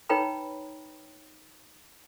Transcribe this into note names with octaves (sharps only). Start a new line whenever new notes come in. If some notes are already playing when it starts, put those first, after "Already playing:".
D#4 B4 C#5 G5 A#5 B5